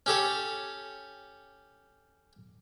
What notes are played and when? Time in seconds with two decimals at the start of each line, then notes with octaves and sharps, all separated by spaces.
0.06 C#4 G4 A4 C#5